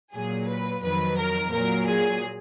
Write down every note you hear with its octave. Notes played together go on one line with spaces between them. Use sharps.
A#2 F#3 G#4
B4
F2 D#3 F#3 B4
A#4
A#2 F#3 A#4
G#4